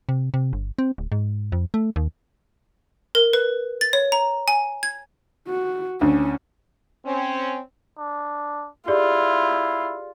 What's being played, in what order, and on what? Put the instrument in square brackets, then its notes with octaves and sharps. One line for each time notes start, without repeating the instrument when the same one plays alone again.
[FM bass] C3
C3
G1
C4
D1
G#2
F2
A3
D#2
[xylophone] A#4
B4
A6
C#5
A#5
G#5
G#6
[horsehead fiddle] F#4
[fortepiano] D2 [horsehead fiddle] C#4
[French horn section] C4 C#4
[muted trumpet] D4
[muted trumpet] E4 [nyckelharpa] F4 [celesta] G4 G#4 D5